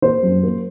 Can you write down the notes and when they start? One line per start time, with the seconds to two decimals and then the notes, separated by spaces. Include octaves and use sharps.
0.02 A#3 C5
0.23 F#2
0.43 A#3